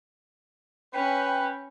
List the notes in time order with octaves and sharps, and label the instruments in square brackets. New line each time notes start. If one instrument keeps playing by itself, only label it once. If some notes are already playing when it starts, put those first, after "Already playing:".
[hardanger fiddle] C#4 [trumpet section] B4 [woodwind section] G5 B5